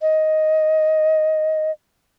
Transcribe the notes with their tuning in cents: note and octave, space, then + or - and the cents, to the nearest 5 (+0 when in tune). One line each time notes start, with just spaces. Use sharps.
D#5 +5